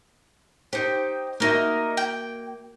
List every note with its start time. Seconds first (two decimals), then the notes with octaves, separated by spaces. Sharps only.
0.73 D#4 G4 C5
1.40 A#3 D#4 F#4 A#4 E5
1.97 G5